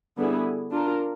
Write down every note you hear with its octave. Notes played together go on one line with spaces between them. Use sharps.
D3 G3 B3 E4 G#4
D4 F4 A#4